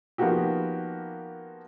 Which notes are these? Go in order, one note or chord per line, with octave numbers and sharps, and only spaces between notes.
F3 A#3 B3 D#4 F#4 G4